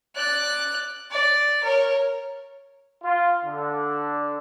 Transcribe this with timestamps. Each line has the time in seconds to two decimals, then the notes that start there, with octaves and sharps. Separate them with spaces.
0.15 D5 F#6
1.11 D5
1.63 A#4 C#5
3.04 F4
3.44 D3